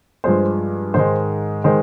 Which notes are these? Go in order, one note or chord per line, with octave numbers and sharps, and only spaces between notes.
G2 F3 G#3 C5
G#2 D#3 G#3 C5
D#3 G#3 C5